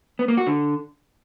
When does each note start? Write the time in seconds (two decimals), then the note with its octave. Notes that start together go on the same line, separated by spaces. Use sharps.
0.19 B3
0.28 A#3
0.37 F#4
0.47 D3